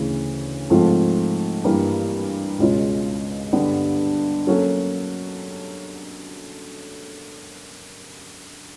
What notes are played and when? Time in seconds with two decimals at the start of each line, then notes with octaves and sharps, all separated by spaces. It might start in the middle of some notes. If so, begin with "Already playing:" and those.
Already playing: D2 C#3 E3
0.70 G#2 F3 A3 C4 F4
1.64 G2 E3 G3 A#3
2.58 C#2 B2 G#3 C#4 F4
3.52 G2 D3 G3 B3 D4
4.47 F#3 A#3 C#4 F#4 A4